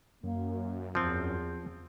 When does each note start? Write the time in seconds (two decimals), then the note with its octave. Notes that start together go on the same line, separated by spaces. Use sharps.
0.23 F#2 A#3
0.95 E2 F3 C4